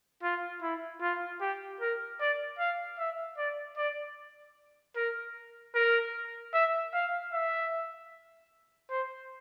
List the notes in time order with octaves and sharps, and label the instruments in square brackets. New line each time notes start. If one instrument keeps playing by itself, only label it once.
[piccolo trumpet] F4
E4
F4
G4
A#4
D5
F5
E5
D5
D5
A#4
A#4
E5
F5
E5
C5